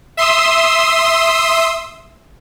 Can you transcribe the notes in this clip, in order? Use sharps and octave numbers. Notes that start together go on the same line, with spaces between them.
E5 C6 D#6 E6